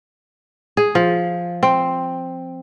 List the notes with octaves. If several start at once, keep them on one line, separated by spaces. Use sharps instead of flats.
G#4
F3
C4